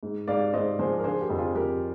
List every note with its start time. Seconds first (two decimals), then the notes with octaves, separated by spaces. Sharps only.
0.03 G#2
0.28 G#2 D5 F5
0.53 G#2 C5 D#5
0.79 F3 G#4 C5
0.99 A#4
1.04 D3 G#4 C5
1.21 G4 A#4
1.30 F2
1.38 F4 G#4
1.55 F2 G4 A#4